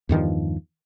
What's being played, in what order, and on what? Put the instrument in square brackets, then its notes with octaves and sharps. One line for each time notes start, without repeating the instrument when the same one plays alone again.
[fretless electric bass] E2 G2 D#3 F3